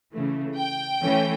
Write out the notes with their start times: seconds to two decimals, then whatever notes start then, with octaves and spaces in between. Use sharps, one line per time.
0.13 C#3 E3 A3
0.57 G5
1.02 E3 A3 C#4